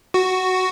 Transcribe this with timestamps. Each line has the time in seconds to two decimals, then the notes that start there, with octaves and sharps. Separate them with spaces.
0.14 F#4